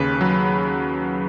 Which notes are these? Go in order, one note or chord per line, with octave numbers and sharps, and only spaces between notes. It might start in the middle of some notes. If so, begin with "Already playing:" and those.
Already playing: D#2 C#3 B4
F#3